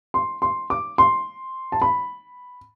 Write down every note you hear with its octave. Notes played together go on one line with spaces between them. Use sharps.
C6
C6
D6
C6
A5
B5